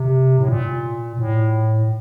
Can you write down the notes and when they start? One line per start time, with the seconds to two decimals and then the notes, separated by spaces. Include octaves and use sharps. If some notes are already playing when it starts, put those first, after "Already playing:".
Already playing: C3
0.39 A2
0.48 A#2
1.19 A2